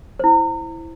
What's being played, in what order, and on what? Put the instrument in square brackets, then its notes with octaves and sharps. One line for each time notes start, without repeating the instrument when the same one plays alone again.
[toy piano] E4 C5